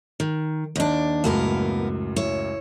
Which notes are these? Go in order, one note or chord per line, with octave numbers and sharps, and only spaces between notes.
D#3
D#2 D4
C#2 F#2 A2 A#3 B3 A#4
E4 C#5